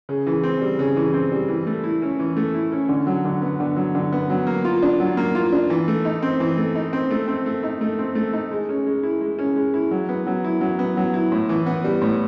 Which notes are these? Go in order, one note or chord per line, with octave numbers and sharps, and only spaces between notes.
C#3
E3
C4
G3
C#3
E3
C4
G3
E3
A3
E4
C#4
E3
A3
E4
C#4
D3
F#3
D3
B3
D3
F#3
D3
B3
F#3
A#3
F4
D4
F#3
A#3
F4
D4
E3
A3
D#4
C4
E3
A3
D#4
C4
A3
C4
A3
D#4
A3
C4
A3
D#4
G#3
C#4
G#3
E4
G#3
C#4
G#3
E4
F#3
B3
F#3
E4
F#3
B3
F#3
E4
A2
E3
B3
G3
A2